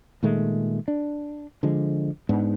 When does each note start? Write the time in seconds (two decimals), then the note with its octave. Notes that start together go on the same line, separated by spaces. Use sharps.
0.23 A#2 D#3 G#3 A3
0.88 D4
1.63 D3 F3 G#3
2.29 G#2 B3 D4